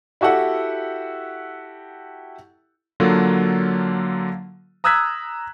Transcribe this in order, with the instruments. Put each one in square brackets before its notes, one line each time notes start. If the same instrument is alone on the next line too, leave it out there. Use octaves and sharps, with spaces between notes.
[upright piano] E4 F#4 G4 A4 F#5
[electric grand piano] D3 F#3 A#3 F4 A4
A#5 D#6 E6 F#6 G#6 B6